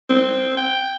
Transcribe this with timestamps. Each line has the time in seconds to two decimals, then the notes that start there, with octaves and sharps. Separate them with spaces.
0.09 C4
0.57 G5